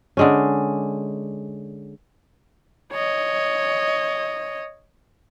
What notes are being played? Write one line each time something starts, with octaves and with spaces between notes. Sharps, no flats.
D3 G#3 C#4
C#5 D#5